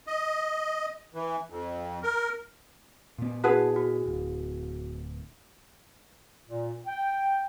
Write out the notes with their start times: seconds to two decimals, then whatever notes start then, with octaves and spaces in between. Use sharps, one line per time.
0.07 D#5
1.15 E3
1.50 F2
2.03 A#4
3.18 A#2 B3
3.44 E4 F#4 G#4 B4 F#5 A5
3.76 F#4
4.06 D1
6.46 A#2
6.86 G5